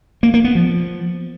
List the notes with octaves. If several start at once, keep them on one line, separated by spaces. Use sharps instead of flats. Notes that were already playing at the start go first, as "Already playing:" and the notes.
A#3
A#3
B3
F3